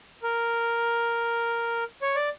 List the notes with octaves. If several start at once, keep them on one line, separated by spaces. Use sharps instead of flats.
A#4
C#5
D5